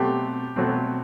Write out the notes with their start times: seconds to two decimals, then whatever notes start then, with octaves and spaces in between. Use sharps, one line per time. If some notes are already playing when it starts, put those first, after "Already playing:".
Already playing: B2 F#3 A3 C4 G4
0.56 B2 F#3 A3 C4